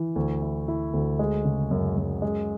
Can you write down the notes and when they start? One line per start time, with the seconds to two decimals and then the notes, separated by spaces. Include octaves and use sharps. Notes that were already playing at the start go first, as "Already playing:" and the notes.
Already playing: E3
0.16 D2
0.42 E4
0.68 E4
0.93 D2
1.19 G#3
1.45 C#3
1.71 F#2
1.97 F#2
2.22 G#3